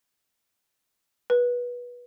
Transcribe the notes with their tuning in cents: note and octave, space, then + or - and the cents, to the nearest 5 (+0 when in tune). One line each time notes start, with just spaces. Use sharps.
B4 -20